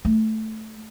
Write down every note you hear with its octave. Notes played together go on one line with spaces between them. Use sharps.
A3